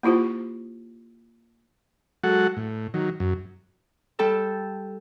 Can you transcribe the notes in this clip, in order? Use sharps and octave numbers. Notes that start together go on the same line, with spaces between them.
A#3 E4 F4 G4 C5
F#3 G#3 F#4 A4 F#5
A2
D#3 F#3
F#2
G3 A4 G5 A5 E6